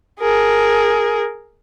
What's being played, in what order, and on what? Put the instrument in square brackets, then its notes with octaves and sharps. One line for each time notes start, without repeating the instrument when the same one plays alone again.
[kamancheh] G#4 A#4